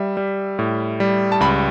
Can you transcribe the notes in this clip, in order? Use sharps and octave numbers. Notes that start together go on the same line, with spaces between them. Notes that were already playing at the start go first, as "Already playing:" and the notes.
Already playing: G3 E5
G3
A2
G3
A5
C#2 B5